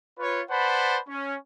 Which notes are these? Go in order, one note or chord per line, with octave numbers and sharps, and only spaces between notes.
F4 B4 C#5
B4 C5 D5 F#5 A5 B5
C#4